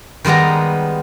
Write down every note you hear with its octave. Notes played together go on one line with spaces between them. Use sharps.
D#3 G3 G#3 B3 A#5